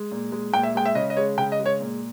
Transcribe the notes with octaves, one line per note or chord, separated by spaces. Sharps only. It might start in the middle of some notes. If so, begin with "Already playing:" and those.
Already playing: G#3
A#2
G#3
A#2 G5
E5
G#3 G5
E5
C#3 D#5
D#5
G#3 C#5
C#3 G5
D#5
G#3
C#5
A#2